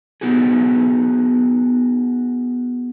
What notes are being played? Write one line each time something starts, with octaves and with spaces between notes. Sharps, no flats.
B3 D#4 F#4 G#4